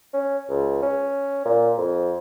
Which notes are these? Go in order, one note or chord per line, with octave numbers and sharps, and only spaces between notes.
C#4
C#2
C#4
A#2
F2